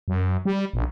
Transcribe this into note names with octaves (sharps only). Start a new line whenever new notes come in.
F#2
G3
A#1